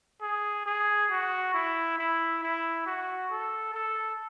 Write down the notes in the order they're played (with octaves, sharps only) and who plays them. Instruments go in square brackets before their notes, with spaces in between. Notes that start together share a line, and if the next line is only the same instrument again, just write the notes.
[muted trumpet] G#4
G#4
F#4
E4
E4
E4
F#4
A4
A4